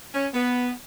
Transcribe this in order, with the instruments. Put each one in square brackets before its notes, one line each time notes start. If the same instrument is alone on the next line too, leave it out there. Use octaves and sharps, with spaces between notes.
[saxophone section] C#4
B3